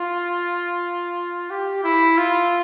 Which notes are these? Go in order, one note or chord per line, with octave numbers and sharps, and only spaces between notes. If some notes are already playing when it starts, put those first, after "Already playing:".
Already playing: F4
G4
E4
F4